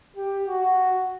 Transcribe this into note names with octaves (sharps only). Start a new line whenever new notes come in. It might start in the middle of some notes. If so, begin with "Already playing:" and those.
G4
F#4